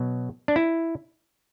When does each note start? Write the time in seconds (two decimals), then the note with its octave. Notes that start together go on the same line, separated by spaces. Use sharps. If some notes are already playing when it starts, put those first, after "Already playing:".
Already playing: B2 F#3
0.48 D4
0.56 E4